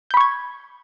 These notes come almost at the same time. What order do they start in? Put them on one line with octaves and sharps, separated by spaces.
G6 B5 C#6 G#6